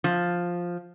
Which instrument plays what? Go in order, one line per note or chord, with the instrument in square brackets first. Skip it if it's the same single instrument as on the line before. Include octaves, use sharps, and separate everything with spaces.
[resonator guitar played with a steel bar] F3